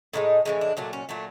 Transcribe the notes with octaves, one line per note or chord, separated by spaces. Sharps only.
A2 E3 G#3 D#4
A2 E3 G#3 C#4
D4
A#2 F#3 A3 D4
C#4
A#2 F#3 A3